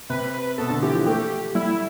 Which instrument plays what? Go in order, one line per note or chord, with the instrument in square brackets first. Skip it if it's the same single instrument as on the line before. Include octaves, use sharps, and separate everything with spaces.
[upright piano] C3 [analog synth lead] B4
[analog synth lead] B4
[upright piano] B2 [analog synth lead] A4
[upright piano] D3
[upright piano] E3 [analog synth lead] G4
[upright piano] F3
[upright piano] A3 [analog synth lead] G4
[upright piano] G3 [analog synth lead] E4